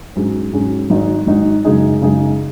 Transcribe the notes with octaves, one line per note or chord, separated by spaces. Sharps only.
G#2 F#3 C#4 G#4
G#2 F#3 C#4 G#4
G#1 G#2 F#3 D#4 F#4
G#1 G#2 F#3 D#4 F#4
F#2 C#3 G#3 D#4 G#4
F#2 C#3 G#3 D#4 G#4